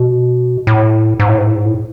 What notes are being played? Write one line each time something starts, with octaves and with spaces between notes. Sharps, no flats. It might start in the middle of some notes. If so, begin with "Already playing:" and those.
Already playing: B2
A2
G#2
A2
G#2
A2
G#2
A2